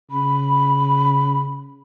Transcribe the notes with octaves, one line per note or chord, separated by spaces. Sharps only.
C#3 B5